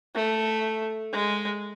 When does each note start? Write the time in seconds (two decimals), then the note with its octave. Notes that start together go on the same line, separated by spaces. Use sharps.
0.15 A3
1.13 G#3